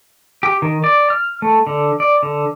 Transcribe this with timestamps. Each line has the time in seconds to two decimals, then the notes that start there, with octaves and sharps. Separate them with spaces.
0.43 G4
0.62 D#3
0.84 D5
1.10 F6
1.42 A3
1.67 D3
2.00 D5
2.23 D3